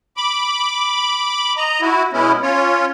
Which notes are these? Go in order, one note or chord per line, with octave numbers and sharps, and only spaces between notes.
B5 D6
D#5 A#5
E4 F#4
B2 G#3 B3 C#4 E4
C#4 F4 C#5